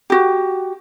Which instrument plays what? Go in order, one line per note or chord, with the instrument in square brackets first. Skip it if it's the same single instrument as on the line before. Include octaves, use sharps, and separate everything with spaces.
[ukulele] F#4 G4